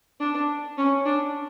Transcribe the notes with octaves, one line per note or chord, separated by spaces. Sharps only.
D4
C#4
D4